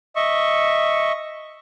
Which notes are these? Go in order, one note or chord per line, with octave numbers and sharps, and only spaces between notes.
D#5 E5 C#6